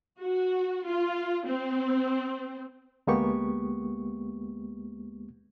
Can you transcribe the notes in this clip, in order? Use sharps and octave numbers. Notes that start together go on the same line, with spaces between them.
F#4
F4
C4
D2 G#3 A#3 B3 G4 C#6